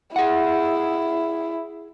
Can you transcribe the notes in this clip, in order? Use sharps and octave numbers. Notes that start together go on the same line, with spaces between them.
E4 G#4 F#5